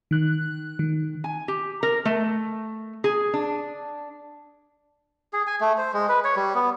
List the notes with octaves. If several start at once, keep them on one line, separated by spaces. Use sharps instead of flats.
D#3 F#6
D#3
G#5
G4
A#4
A3
G#4
D4
G#4
G#5
A3
C5
G#3
B4
C#5
G3
B3